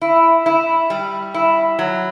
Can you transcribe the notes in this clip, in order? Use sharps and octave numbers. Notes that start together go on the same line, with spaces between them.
E4
E4
G3
E4
F#3